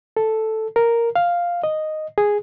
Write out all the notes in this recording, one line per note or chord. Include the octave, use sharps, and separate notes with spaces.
A4
A#4
F5
D#5
G#4